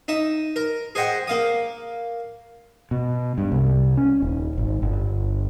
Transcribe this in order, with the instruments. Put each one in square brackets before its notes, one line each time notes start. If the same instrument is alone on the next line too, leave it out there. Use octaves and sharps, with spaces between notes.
[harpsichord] D#4 E5 D#6
A#4
G#4 C5 D#5 F#5 G5
A#3 F5 D#6
[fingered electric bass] B2
G2
C2
C#4
D#1
G#1
G1